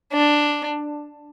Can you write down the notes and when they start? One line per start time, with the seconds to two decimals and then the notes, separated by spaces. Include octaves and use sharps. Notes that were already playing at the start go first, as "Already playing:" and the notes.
0.13 D4